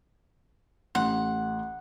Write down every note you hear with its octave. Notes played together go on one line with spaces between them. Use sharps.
A1 F#5 C6